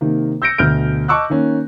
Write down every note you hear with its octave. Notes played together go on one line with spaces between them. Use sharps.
C3 D#3 A#3
E6 G6 A#6 C#7 D7
D2 B2 F6 G6 D7
D#5 A5 C#6 D6 E6 F#6
D#3 A#3 C#4